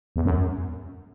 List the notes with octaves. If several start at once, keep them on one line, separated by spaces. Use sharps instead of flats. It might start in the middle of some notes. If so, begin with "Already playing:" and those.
E2
F#2